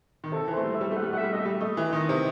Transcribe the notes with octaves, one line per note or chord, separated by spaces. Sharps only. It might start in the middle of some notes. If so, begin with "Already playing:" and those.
D#3
C3 A4
E3
A3 C5
G3
E5
G3
A3
F#5
G3
A3 E5 F#5
G3
A3 D#5
E5
G3
A3 D#5
E3
D#3 D#5
C3